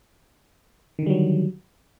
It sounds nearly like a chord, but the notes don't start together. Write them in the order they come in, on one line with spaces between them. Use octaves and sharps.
D#3 D3 G3 F#3